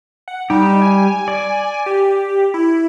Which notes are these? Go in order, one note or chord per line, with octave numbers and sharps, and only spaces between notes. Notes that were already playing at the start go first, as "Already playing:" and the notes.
F#5
G3 D#4 G4
G#5
D5
G4
E4